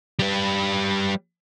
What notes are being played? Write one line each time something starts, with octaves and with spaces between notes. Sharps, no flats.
G3 B4